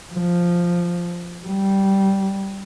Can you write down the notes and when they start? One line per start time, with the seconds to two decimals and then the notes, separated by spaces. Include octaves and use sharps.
0.13 F3
1.46 G3